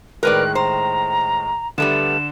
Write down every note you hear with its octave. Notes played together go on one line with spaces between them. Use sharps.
A2 D#3 G#3 A#4 B4 D5 F#6
C5 A#5
D3 G3 A3 B3 E7